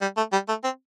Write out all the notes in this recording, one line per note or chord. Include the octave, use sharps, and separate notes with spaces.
G3
A3
G3
A3
C4